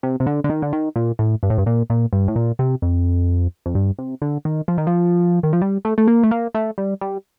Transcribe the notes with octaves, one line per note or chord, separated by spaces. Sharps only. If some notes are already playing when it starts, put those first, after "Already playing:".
C3
C3
D3
D3
D#3
D3
D#3
A#2
A2
G2
A2
G2
A#2
A#2
G2
A2
A#2
C3
F2
F2
G2
C3
D3
D#3
F3
D#3
F3
D#3
F3
G3
A3
A3
A#3
A3
A#3
A3
G3
G3